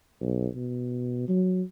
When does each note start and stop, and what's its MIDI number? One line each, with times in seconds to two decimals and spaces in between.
0.21 0.47 35
0.56 1.23 47
1.28 1.62 54